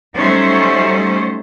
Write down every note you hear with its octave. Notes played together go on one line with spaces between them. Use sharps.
F#3 G3 A3 C#4 D#4 C5